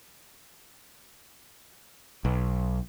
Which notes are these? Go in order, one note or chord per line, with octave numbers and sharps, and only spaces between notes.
B1